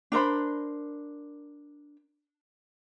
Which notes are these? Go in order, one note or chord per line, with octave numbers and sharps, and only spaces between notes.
D4 A#4 C5 B5